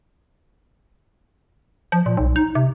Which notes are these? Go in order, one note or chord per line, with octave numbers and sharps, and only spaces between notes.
F3
A#2
B1
D#4
C3